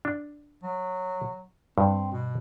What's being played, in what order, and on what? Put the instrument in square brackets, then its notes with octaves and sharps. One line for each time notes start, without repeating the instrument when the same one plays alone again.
[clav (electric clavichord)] D4
[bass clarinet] F#3
[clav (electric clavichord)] G2 [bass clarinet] C4
[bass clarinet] B2